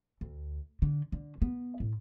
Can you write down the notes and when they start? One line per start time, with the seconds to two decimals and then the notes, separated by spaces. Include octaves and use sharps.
0.21 D2
0.82 D3
1.12 D3
1.42 B3
1.80 A2